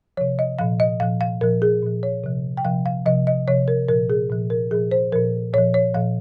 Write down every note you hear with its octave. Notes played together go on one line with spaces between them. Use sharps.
C3 F3 C#5
D#5
A#2 F3 F5
D#5
A#2 F3 F5
F5
A#2 F3 A#4
G#4
A#2 F3
C#5
C3 F3
G5
C3 F3 F5
F5
C3 F3 D#5
D#5
C3 F3 C#5
A#4
A#2 F3 A#4
G#4
A#2 F3
A#4
A#2 F3 G#4
C5
A#2 F3 A#4
A#2 F3 C#5
C#5
A#2 F3 F5